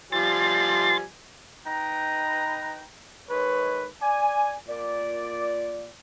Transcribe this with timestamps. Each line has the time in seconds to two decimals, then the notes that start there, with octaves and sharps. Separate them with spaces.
0.12 F3 G3 G#5 C6 A6
1.66 D#4 B4 G5 A#5
3.29 D#3 G#3 B4 C#5
4.01 D5 G#5
4.68 A#2 D5